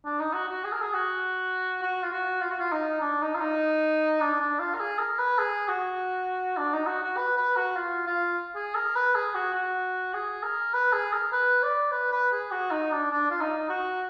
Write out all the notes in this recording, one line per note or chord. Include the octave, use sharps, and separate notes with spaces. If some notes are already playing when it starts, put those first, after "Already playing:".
D4
D#4
F#4
F#4
G#4
A#4
G#4
F#4
F#4
F4
F#4
F4
F#4
F4
D#4
D4
D#4
F4
D#4
D4
D4
F4
A#4
G#4
A#4
B4
G#4
F#4
D4
D#4
F#4
F#4
B4
B4
F#4
F4
F4
G#4
A#4
B4
G#4
F#4
F#4
G#4
A#4
B4
G#4
A#4
B4
D5
B4
B4
G#4
F#4
D#4
D4
D4
F4
D#4
F#4